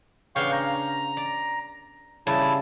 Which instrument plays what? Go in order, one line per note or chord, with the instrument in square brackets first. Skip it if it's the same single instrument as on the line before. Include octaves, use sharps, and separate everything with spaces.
[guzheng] C#3 B3 D4 [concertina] F5 G5 C#6
[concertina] A#5
[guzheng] D5
[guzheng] C#3 G3 [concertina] E4 A5